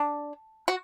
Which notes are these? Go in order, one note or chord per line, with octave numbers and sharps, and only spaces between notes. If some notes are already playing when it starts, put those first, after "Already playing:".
Already playing: D4
F#4